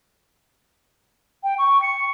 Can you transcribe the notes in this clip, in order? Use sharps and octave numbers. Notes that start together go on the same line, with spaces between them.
G5
C#6
C#7